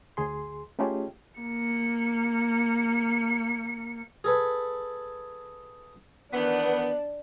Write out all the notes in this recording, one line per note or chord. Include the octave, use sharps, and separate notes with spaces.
D2 G#4 C6
A3 C#4 D#4 F4 G4 G#4
A#3 C#7
G#4 A4 B4
D#3 E3 B3 D4